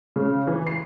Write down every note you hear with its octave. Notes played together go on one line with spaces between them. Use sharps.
C#3
E3
C7